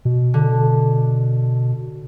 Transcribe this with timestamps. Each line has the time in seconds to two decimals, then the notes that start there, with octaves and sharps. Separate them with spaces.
0.05 B2
0.34 D3